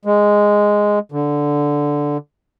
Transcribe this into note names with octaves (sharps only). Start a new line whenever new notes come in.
G#3
D3